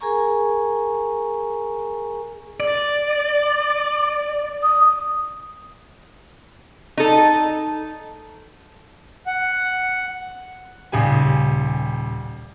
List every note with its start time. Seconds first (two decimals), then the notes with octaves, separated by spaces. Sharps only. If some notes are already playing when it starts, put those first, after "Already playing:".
0.01 G#4 A#4 G#5 A#5 C#6
2.60 D5
4.63 D#6
6.97 D#4 A4
9.27 F#5
10.92 D#1 C#3 G4 G#5